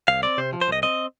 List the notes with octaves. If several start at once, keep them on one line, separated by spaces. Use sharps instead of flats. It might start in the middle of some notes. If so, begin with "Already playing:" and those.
C2 F5
C4 D5
C3 C5
F3
C5
C2 D#5
C4 D#5